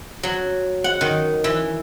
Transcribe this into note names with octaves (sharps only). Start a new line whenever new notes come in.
F#3
F#5
D#3
E3